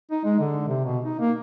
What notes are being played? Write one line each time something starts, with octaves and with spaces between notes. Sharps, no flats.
D#4
G#3
D3
C3
B2
D#4
A#3